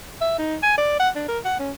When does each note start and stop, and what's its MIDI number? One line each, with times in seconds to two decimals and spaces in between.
0.21 0.34 76
0.39 0.56 63
0.63 0.77 80
0.78 0.95 74
1.00 1.09 78
1.16 1.25 62
1.28 1.39 70
1.45 1.59 78
1.59 1.72 61